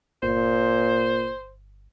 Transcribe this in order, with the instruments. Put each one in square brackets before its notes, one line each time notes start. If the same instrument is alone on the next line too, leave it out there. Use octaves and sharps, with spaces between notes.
[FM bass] G1 [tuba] A#2 [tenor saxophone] C5